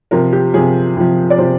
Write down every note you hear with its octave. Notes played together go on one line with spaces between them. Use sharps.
C3 F3 A#4
G4
C3 F3 G#4
C3 F3
D5
C3 F3 C5